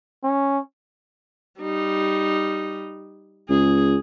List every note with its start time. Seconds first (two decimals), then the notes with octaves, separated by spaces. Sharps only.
0.24 C#4
1.60 G3 D#4
3.49 C#2 G#4